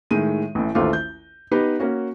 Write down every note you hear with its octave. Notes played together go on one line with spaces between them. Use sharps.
A2 D#3 G#3 D#7
A1 A2
A1 D#2 A3 F4 C5 D6
G6
B3 D#4 G4 B4
A#3 C#4 F#4